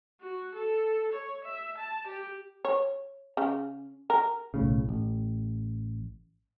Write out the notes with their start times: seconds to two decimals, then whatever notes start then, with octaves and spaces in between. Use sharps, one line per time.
0.21 F#4
0.55 A4
1.13 C#5
1.44 E5
1.78 A5
2.07 G4
2.65 C#5
3.37 C#3
4.10 A#4
4.54 B1 A2 C#3
4.89 A1